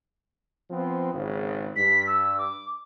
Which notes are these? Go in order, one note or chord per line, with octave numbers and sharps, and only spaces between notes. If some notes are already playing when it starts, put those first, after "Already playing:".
F3 B3 C4
G#1 C#3
G2 B6
E6
D6